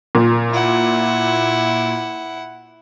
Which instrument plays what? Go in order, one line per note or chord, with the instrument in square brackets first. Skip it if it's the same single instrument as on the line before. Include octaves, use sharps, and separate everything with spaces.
[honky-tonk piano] A#2
[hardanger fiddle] E4 F#5